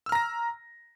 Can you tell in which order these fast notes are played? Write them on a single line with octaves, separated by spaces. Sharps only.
E6 F6 A#5 A#6